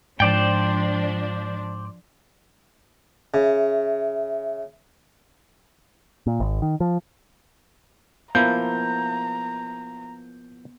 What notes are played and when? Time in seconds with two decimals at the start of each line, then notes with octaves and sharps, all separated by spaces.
0.20 G#2 F3 D4 C5 D5 G5
3.34 C#3 E5
6.27 A#2
6.40 G#1
6.62 D#3
6.80 F3
8.35 F3 A#3 B3 E4 A#5 G6